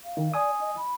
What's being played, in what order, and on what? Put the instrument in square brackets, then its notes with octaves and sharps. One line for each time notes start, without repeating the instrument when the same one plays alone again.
[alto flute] F5
[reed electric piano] D#3
[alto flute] D5 [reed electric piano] G#5 D#6
[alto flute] D#5
B5